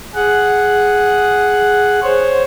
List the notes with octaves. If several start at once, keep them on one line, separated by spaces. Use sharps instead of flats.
G#4 F#5
C5 C#5